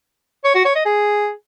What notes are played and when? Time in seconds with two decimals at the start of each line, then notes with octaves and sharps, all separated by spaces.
0.45 C#5
0.55 F#4
0.65 C#5
0.75 D#5
0.86 G#4